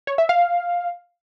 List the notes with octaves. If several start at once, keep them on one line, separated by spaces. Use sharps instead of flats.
C#5
E5
F5